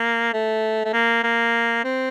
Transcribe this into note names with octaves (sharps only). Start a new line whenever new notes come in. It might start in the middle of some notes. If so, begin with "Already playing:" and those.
Already playing: A#3
A3
A3
A#3
A#3
C4